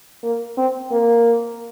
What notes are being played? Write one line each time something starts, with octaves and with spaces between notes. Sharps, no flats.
A#3
C4
A#3